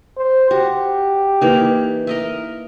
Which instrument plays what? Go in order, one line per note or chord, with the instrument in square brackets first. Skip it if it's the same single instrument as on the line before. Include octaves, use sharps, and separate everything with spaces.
[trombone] C5
[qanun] F#4 [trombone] G4
[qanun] E3 A#3 D#4
A#4 D#5 E5